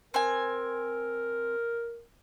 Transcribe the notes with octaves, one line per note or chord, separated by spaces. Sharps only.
C4 A#4 G#5